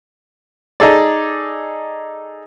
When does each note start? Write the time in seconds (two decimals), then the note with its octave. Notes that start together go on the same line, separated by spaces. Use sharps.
0.80 D#4 G#4 A4 D5